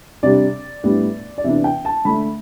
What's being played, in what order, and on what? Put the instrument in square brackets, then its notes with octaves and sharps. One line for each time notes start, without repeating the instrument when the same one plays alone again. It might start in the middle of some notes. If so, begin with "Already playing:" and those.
[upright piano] C3 G3 D4 D5
A2 G3 B3 D4
D5
C3 E3 B3 D4 E5
G5
A5
D3 A3 D4 B5